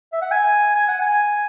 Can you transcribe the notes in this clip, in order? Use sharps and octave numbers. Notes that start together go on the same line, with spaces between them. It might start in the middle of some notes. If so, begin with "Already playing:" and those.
E5
F#5
G#5
G#5
F#5
G#5